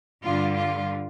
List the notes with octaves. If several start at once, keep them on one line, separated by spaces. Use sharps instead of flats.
G2 D3 G3 F4
F4